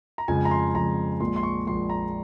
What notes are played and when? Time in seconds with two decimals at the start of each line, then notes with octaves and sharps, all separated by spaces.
0.18 A#5
0.28 F2 C#3 F3 G#3 G#5
0.45 A#5
0.51 C6
0.75 F2 C#3 F3 G#3 A#5
1.20 A#1 A#2 F3 G#3 C6
1.36 C6
1.43 C#6
1.66 A#1 A#2 F3 G#3 C6
1.90 A#5